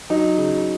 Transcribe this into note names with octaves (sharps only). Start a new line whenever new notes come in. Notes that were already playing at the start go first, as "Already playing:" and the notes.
F#3 D#4
C#3